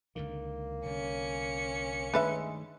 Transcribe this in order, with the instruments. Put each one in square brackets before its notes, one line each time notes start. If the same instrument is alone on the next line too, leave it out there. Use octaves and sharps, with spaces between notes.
[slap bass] C#2 D3 D#3 [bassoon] A#3
[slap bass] C2 D3 [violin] C#4 C#7
[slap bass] G2 D#3 A3 [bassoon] G#3 [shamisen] D4 B4 E5